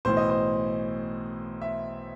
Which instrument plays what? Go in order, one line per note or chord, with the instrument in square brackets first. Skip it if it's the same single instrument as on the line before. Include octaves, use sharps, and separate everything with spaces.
[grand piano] B1 A2 E3 C5
D#5
C5
E5